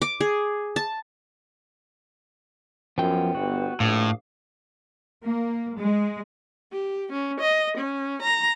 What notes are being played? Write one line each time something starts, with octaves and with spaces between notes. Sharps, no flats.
D6
G#4
A5
F#2 F3 B3 G5
G1 F#4
A#1 A2 F5 D6 D#6
A#3
G#3
G4
C#4
D#5
C#4
A#5